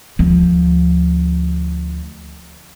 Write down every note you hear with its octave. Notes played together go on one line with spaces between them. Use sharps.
D2 F3